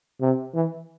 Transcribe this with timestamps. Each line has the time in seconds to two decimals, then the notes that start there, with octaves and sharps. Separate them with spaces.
0.21 C3
0.55 E3